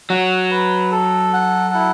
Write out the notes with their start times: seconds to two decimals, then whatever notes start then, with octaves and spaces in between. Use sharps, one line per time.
0.10 F#3 F#5
0.51 B4
0.92 A4
1.33 F#5
1.74 E4